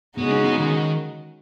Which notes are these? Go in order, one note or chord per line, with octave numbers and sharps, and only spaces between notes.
C#3 G#3 B3 D#4 F#4
C#4
B3
D#3